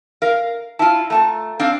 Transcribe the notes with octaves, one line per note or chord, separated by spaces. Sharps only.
A#4 F5
E4 F4 A5
A3 F4 A5 A#5
C4 D4 F5